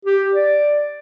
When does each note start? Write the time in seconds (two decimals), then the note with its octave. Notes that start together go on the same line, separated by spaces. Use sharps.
0.05 G4
0.33 D5